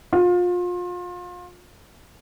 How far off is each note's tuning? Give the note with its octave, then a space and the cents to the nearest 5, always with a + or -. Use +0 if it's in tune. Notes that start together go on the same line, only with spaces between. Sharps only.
F4 +30